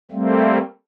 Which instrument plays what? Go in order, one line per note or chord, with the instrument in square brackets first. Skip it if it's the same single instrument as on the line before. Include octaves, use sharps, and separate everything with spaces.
[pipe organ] G3 A3 A#3 C4